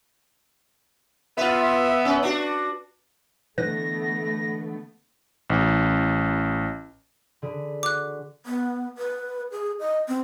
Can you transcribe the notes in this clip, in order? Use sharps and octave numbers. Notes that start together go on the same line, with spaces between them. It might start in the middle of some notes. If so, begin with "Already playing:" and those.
B3 F4 B4 E5
C#4 B4
D4 F#4
D3 E3 G#3 A3 B3 B4 A#6
A1
D3 G#4 B4
F#4 D6 F#6
B3
B4
G#4
D#5
C4